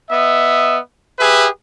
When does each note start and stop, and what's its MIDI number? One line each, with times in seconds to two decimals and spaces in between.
0.10 0.78 59
0.10 0.78 75
0.10 0.78 76
1.19 1.47 67
1.19 1.47 68
1.19 1.47 71
1.19 1.47 76